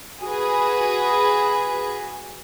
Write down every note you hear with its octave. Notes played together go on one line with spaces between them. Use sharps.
F#4 G#4 B4